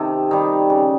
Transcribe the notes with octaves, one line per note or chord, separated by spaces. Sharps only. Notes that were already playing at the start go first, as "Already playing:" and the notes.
Already playing: C3 D#3 A4
D#3 G3
C#3